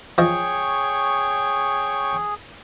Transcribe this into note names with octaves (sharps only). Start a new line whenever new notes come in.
F3 G#4 C#5 D#5 G5 C#6